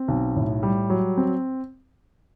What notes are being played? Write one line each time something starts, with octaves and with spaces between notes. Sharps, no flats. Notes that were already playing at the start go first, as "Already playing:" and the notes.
Already playing: C4
B1
A2
G3
F#3
C4